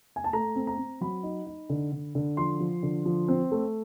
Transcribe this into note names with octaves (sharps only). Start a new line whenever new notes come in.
G#5
A5
A3 A#5
C4
A#5
C4
F#3 B5
D#4
D#4
D3
D3
D3
F3 C6
F3
D3
F3
C4
A3